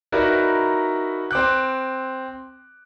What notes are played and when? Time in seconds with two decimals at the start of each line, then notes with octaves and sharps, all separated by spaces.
0.12 D#4 E4 F#4 A#4 B4 D5
1.31 C4 D6 F#6